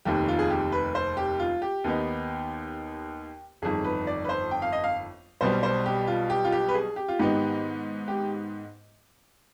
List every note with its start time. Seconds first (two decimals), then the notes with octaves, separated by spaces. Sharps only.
0.05 F1 D#2 D#3 G4
0.28 F4
0.39 G#4
0.50 G4
0.72 B4
0.95 C5
1.17 G4
1.40 F4
1.62 G4
1.84 D#2 D#3 B3 D#4
3.62 G1 F2 D#3 G#4
3.84 B4
4.07 D5
4.24 B4
4.29 C5
4.51 G5
4.62 F5
4.73 D#5
4.84 F5
5.41 B1 B2 G3 C5
5.63 C5
5.86 G4
6.07 F4
6.30 G4
6.45 F4
6.52 G4
6.69 B4
6.75 G#4
6.96 G4
7.08 F4
7.19 G#2 D#3 B3 D#4 G4
8.08 G4